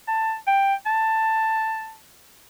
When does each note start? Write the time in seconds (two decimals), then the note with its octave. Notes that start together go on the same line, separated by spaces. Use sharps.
0.08 A5
0.47 G5
0.86 A5